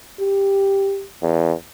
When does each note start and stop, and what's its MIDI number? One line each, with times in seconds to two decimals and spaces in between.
0.21 1.06 67
1.22 1.52 40